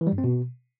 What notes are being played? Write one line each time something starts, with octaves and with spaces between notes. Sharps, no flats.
E3
G3
G2
C4
B2